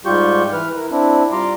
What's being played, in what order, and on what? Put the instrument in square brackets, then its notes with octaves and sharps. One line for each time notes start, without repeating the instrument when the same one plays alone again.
[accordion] G#2 G3 F4 G4 C#6 G6
E3 B4 F6
E4 A#4
C4 D4 E4
G3 F4 A#5 C6 D6